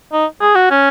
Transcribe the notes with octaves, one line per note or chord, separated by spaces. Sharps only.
D#4
G#4
F#4
C#4